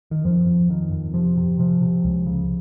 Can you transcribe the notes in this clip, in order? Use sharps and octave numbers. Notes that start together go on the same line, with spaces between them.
D#3
F2 F3
F2
F2 D#3
F2
C3 F3
C3
C3 F3
C3
C#2
C#3